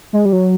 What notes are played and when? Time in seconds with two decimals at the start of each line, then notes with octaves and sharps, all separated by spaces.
0.13 G#3
0.25 G3
0.33 F#3